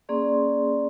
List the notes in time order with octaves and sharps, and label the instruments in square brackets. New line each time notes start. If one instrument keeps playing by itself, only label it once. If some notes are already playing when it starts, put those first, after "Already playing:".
[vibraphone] A#3 C#4 G#4 D5 C6